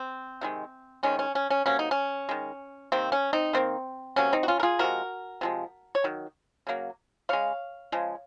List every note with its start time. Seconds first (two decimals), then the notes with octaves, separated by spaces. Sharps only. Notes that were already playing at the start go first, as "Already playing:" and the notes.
Already playing: C4
0.41 C3 D#3 G#3
1.03 C3 D#3 G#3 C#4
1.19 C#4
1.35 C#4
1.50 C#4
1.66 C3 F#3 A#3 C#4
1.79 D#4
1.91 C#4
2.29 D#3 G#3
2.92 C3 D#3 A#3 C4
3.12 C#4
3.33 C4 D#4
3.53 D#3 A#3 C4
4.16 C3 F#3 A#3 C#4
4.33 C4 D#4
4.43 F#4
4.48 C#4 F4
4.60 A#4
4.63 F4 G#4
4.79 C3 F3 G#3 F#4 A#4
5.41 C3 F3 G#3
5.95 C#5
6.04 D#3 F#3
6.67 C#3 F#3 A#3
7.29 C#3 G#3 C#5 F5
7.92 C#3 F3 G#3